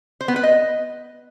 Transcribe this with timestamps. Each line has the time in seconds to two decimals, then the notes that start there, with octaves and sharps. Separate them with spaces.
0.21 C5
0.28 B3
0.36 B4
0.43 D#5